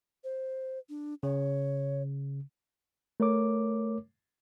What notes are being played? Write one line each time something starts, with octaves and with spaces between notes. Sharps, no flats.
C5
D4
C#3 C#5
A3 A#4 C#5 D6